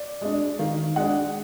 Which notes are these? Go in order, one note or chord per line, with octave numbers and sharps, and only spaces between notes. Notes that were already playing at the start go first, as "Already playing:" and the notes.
Already playing: D5
G#3 D4
D#3 F5
G#3 D4 F#5